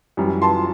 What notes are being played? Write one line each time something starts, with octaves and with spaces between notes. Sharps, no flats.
F#2 E3 G3
A5 C6